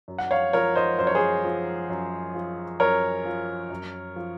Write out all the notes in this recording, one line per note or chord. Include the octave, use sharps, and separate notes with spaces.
F#2
F#5
C#5 F5
F3 A#4 C#5
C5 D#5
F#2 C5
C#5
G#4 C5
F3
F#2
F3
F#2 A#4 C#5
F3
F#2
F3